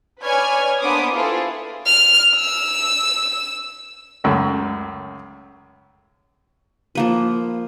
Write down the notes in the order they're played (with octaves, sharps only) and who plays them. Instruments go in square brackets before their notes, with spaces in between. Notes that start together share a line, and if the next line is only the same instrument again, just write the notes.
[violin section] B4 C#5 D5 G#5 F6 G#6
A#3 B3 D4 C5 D6 D#6
E4 F4 G#4 A4 B4 C5
[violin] F6
E6
[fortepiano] C#2 F#2 A3
[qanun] F3 A#3 B4